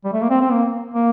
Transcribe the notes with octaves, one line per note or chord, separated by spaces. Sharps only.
G3
A3
A#3
C4
C4
A#3
A#3